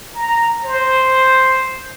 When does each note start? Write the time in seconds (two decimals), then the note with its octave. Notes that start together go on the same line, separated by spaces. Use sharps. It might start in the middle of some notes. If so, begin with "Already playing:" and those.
0.15 A#5
0.64 C5